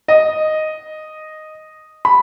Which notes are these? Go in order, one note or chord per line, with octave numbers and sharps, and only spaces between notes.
D#5
B5